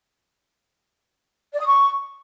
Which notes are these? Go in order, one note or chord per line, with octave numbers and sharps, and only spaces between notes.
D5
D#6
C#6